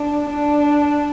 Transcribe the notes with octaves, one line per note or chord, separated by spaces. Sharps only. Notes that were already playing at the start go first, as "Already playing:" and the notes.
Already playing: D4
D4